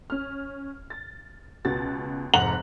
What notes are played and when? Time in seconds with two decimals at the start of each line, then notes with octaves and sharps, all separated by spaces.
0.10 C#4 F6
0.90 A6
1.65 C#2 B2 F#4 A6
2.34 F1 G#2 F#5 A#5 F#7